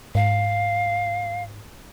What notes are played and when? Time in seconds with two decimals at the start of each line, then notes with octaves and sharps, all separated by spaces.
0.15 G#2 F5